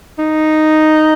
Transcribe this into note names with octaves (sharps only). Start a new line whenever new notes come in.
D#4